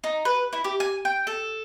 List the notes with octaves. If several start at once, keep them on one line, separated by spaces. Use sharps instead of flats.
D#4
B4
E4
G4
G#5
G5
A4